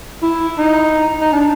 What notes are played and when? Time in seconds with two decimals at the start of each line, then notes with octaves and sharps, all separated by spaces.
0.22 E4
0.58 D#4
1.21 D#4
1.32 D4